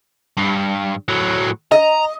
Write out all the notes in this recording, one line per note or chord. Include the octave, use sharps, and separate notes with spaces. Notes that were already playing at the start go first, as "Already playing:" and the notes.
G2
A2 F#3
D#5 A#5